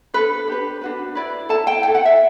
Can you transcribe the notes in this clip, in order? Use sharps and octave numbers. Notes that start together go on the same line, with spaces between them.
D4 A4 B4
D4 G4 B4
D4 F#4 B4
E4 B4 D5
E4 A4 A5
G5
E4 A4 G5
F#5
E5